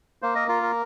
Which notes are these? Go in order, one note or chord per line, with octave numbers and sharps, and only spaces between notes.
A#3 C5
A#4 D#5
F4 A#4
A#4